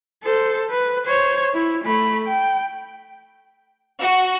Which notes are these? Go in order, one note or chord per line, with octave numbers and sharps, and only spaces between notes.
A4 C5
B4
C5 C#5
E4
A3 B5
G5
F#4